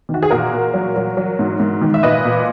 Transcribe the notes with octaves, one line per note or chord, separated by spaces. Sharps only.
D#3
F#4
G#4
A#2 F#4 A#4
A#2
F#3
F#3
F#3
G#2
G#2
D#3
E5
A#2 B4 D#5
A#2